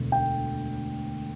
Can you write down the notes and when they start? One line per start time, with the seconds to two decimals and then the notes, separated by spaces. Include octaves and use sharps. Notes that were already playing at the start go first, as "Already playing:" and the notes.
Already playing: E1 D2
0.12 G5